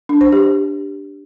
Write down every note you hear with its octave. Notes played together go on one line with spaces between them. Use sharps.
D4
C5
G4